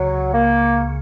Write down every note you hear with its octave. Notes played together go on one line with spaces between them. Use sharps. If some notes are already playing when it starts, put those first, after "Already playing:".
Already playing: C#2 C#3 F#3
A#3